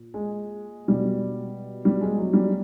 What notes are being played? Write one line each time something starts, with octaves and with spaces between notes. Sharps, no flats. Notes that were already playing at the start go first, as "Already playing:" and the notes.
Already playing: A#2
G#3
B2 G3
G3
G#3
F#3
G3